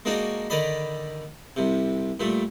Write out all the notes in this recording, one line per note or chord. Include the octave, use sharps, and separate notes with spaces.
G#3 A#3 D4 D#4 F#4
D3 D#3 D5 D#5 B5
C2 C3
A#2 G3 A3